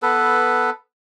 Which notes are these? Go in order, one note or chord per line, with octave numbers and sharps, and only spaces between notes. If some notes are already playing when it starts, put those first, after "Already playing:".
B3 A4 B4